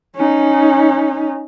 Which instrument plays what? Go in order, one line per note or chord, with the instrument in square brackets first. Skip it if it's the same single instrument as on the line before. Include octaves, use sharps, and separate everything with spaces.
[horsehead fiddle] C#4 D#4